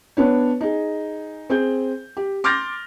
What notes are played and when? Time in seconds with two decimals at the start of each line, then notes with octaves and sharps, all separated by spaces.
0.17 B3 D4 C#5
0.61 D#4 G#4
1.50 C4 G#4 G6
2.17 G4
2.44 C6 D6 F6 G6 A6 A#6